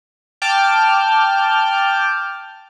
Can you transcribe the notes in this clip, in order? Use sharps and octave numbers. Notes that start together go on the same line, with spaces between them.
G5 A5 D6 F6 G6